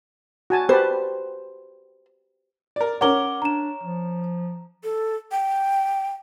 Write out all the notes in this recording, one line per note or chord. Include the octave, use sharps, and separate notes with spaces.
F#4 G#5 A5
G4 B4 C5 A5
A#4 D5
C#4 A#4 C#5 F#5 D6 G7
D4 A#5 E7
F3
A4
G5